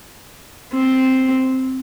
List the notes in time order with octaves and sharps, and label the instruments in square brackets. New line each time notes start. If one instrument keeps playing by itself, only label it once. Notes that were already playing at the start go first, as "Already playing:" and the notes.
[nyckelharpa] C4